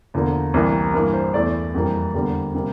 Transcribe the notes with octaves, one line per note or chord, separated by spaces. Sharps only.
E2 D3 F3 A#3
C2 C3 E3 A#3
G2 E3 A#3 A#4
C5
E2 E3 A3 D5
F2 E3 G3 A#3
E2 D3 G3 A#3
C3 G3 A#3